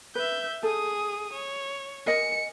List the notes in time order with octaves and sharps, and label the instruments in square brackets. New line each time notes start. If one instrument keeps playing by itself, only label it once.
[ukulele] B4 [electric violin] E5 G6
[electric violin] G#4 D#6 [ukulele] A4
[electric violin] C#5
[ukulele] A#4 D#5 G#5 [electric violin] C#7